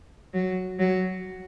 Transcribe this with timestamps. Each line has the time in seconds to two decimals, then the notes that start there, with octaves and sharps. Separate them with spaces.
0.33 F#3
0.78 F#3